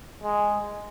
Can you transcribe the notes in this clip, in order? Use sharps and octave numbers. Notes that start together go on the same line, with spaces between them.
G#3